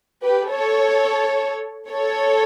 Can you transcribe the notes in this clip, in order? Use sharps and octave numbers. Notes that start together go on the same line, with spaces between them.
G4 B4
A4 C#5
A4 C#5